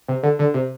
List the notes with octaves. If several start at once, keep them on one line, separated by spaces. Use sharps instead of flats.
C3
D3
D3
C3